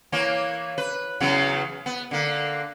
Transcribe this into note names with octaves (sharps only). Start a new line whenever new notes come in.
E3 A#3 C#5
B4
E2 C#3 F#3
B3
D3 A#3